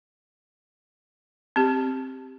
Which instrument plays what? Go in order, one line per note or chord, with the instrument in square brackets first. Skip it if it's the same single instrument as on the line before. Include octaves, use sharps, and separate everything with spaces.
[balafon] C4 G4